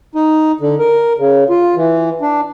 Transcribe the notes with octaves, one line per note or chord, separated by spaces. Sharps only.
D#4
D3
A#4
C#3
F4
E3
D4